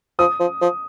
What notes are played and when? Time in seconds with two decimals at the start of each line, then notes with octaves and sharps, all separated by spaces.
0.19 F3 D#6
0.40 F3
0.62 F3